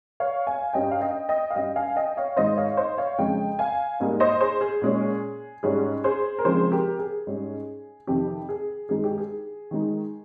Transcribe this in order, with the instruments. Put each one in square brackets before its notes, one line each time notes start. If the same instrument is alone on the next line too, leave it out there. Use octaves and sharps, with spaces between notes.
[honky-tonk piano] C#5 F5
F5 G#5
G2 G3 C#4 D#5 G5
F5
D#5 G5
D#5 G5
F5
G2 G3 C#4 D#5 G5
F5 G#5
D#5 G5
C#5 F5
G#2 D#3 G#3 D#4 C5 D#5
C#5 F5
C5 D#5
C#5 F5
F2 C#3 G#3 D#5 G5
F5 G#5
G#2 G3 A#3 D#4
C5 D#5
G#4 C5
G#4
A#2 G#3 C#4
G#2 G3 C#4 G#4
G#4 C5
A#4
C#3 F3 G#3 C4 G#4 C5
G4 A#4
G#4
G#2 G3 C#4
F2 C3 D#3 G4
G#4
G2 D#3 G#3 D#4 G#4
G4
G#4
D#3 G#3 D#4